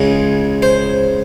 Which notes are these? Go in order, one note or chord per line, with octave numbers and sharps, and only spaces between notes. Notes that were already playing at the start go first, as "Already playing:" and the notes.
Already playing: C#2 C#3 G#3
C5